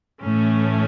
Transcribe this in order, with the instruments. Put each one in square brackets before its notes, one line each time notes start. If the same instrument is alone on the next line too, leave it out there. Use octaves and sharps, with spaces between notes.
[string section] A2 E3 A3 C#4